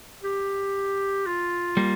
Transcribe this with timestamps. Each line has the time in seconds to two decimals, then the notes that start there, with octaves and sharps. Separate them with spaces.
0.23 G4
1.26 F4
1.77 G3 A#3